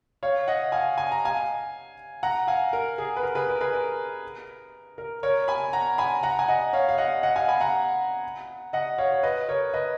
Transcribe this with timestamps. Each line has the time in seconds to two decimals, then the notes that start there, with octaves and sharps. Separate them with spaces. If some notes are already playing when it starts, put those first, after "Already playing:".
0.23 C#5 F5
0.48 D#5 F#5
0.72 F5 G#5
0.98 G#5
1.12 A#5
1.25 F5 G#5
2.23 F#5 A#5
2.47 F5 G#5
2.73 A#4
2.98 G#4
3.17 B4
3.23 A#4
3.35 G#4 B4
3.48 A#4
3.61 G#4 B4
3.73 A#4
4.98 A#4
5.23 A#4 C#5
5.48 G#5 B5
5.73 F#5 A#5
5.98 G#5 B5
6.23 F#5 A#5
6.39 G#5
6.48 D#5 F#5
6.73 C#5 F5
6.89 F5
6.98 D#5 F#5
7.23 D#5 F#5
7.36 F5 G#5
7.48 G#5 B5
7.60 F#5 A#5
8.73 D#5 F#5
8.98 C#5 F5
9.12 C#5
9.23 B4 D#5
9.49 A#4 C#5
9.74 B4 D#5